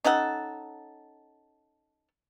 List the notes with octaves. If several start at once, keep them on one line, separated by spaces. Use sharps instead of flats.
C#4 D#4 A4 F#5